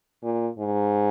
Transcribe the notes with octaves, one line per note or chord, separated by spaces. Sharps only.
A#2
G#2